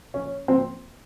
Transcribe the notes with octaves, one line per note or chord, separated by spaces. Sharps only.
C#4
C4